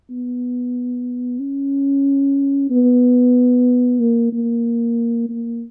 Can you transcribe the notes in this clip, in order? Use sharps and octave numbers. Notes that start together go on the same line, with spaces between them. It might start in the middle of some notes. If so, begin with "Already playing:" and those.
B3
C#4
B3
A#3
A#3
A#3